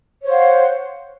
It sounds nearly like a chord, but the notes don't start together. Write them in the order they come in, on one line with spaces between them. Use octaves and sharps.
C#5 C5 F5 F#5